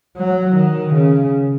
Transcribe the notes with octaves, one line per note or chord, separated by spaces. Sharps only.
F#3
D#3
C#3